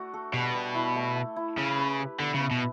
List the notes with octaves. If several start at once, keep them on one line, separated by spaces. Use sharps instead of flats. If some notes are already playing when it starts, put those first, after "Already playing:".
Already playing: A3 D4 F#4
A4
B2 G3
G3
E4
A3
A3
E4
C#3 B4
B4
G4
D3 B3
C#3
B3
B2